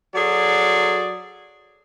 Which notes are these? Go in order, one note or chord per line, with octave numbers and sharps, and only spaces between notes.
F#3 F#4 G#4 A4 D5